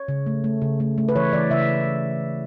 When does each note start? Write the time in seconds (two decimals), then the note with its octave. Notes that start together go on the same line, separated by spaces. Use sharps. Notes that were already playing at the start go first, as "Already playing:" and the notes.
Already playing: C#5
0.08 C#3
0.26 A3
0.44 A3
0.62 C#3
0.80 A3
0.98 A3
1.09 B4
1.16 E3 C#5
1.33 E3 D5
1.51 C#3 E5